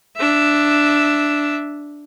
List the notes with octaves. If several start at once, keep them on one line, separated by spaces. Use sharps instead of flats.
D4 E5